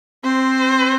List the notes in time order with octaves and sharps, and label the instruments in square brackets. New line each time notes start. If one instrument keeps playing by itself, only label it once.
[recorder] C4 [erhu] C5